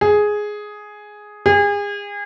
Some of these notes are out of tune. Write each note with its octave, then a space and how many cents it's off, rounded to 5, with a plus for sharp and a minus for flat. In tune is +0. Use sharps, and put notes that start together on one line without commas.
G#4 +5
G#4 -35